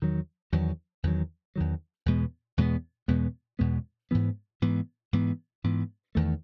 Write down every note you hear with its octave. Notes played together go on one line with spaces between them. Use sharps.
E2 D#3 F#3
E2 D#3 F#3
E2 D#3 F#3
E2 D#3 F#3
E2 B2 G#3 B3
E2 B2 G#3 B3
E2 B2 G#3 B3
E2 B2 G#3 B3
G#2 E3 B3
G#2 E3 B3
G#2 E3 B3
G#2 E3 B3
E2 D#3 A3